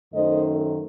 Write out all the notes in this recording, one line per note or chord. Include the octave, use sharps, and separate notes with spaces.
F#2 D#3 A3 D#4 C5 D#5